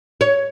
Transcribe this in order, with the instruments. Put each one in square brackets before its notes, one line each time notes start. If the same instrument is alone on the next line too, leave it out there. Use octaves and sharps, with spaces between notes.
[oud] C#5